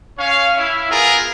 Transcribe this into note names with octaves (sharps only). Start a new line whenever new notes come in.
C#4 C#5 F5
E4
B3 F4 G#4 A#4